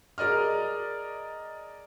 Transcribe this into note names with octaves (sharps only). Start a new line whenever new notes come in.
G#4 A#4 D5 D#5 F6